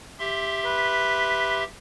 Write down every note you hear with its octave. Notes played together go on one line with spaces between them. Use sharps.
G4 E5 C6
B4